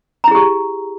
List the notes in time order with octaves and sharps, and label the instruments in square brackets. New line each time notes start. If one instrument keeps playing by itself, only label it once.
[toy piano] A#5
E4
G#4
G4